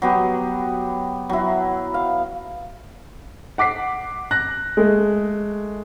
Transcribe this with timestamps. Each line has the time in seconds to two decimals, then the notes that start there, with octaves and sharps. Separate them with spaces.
0.02 F#3 B3 G4
1.29 F#3 E4
1.94 F5
3.58 F#5 D6 B6 C7
4.31 F#6 A#6
4.77 G#3 A3